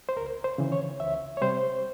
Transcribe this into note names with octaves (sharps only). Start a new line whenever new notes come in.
C5
C#2 A#4
C5
C#3 E3
C#5
C#2 E5
C#5
C3 G3 C5